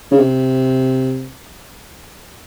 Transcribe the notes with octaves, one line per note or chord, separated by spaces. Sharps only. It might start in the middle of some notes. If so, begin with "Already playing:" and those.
C#3
C3